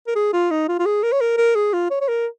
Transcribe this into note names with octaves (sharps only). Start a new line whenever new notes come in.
A#4
G#4
F4
D#4
F4
F4
G#4
A#4
C#5
A#4
A#4
G#4
F4
C#5
C#5
A#4